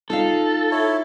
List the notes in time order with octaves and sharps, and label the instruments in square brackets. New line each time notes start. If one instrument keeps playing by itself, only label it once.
[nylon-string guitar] D#4 F4 F5 [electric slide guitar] A4
[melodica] E4 C#5